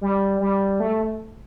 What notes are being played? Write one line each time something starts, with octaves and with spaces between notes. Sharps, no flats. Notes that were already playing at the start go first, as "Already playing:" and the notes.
G3
G3
A3